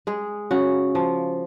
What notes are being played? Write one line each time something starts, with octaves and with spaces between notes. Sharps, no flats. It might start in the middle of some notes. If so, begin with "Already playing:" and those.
G#3 G#4
C#3 F#4
F3